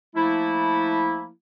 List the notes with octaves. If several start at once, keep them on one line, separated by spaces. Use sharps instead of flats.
F3 A3 A#3 E4